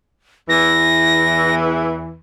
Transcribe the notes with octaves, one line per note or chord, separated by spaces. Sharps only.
E2 E3 A#6